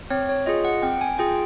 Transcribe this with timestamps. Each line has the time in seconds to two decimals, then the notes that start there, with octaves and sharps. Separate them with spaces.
0.11 C4 C#5
0.29 C#5
0.46 F4 G#4 D#5
0.65 F#5
0.82 C4 G5
1.01 G#5
1.18 F4 G#4 G5